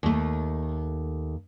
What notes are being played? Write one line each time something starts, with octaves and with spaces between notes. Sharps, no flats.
D#2 A3